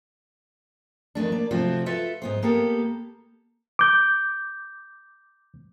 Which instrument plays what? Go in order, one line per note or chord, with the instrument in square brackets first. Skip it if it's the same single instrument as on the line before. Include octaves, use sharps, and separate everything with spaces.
[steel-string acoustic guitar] F2 D#3 A3 D4
A#3 D5
C3 F3 A3 C4 F4 F#4
F4 A4 B4 E5
G#2 B3 C5
A#3 B3 G4 A4
[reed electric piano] D6 G6